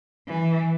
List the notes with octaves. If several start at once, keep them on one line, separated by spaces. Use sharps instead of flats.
E3